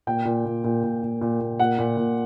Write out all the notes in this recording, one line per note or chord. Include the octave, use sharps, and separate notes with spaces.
A#2 G5
A#2
A#2
A#2
A#2
A#2
A#2
A#2
A#2 F#5
A#2
A#2